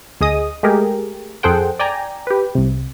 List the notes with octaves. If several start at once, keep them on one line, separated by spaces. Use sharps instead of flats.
D2 G#4 D#5 D#6
G#3 A3 G4 G#4 A#4
F2 G#4 A4 C5 F#5 G5
D5 G5 G#5 A#5
G4 B4
C2 C3